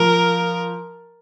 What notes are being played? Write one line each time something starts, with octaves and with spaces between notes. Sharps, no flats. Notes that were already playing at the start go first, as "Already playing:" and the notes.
Already playing: F3 A#4